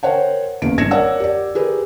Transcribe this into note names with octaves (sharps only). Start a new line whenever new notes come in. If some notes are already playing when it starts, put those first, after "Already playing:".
A#4 C5 C#5 F#5 G5
F#1 E2 A#3 D7
G#1 G2 G#6 A#6 C#7 E7
A#4 C#5 D5 F#5 E6
G4 D5
G4 G#4 A#4 B4